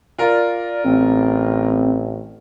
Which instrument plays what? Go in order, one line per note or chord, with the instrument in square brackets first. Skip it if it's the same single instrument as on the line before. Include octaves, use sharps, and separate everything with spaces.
[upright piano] F4 A#4 [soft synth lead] D5
[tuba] A1 [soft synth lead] C4